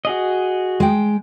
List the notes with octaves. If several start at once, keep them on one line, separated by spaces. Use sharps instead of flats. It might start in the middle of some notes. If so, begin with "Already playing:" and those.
F#4 G#4 D#5
G#3 G5